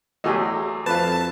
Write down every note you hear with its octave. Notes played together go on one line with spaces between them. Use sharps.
E2 F#3 A3 G4 G#4 D#5
F2 B4 F5 A5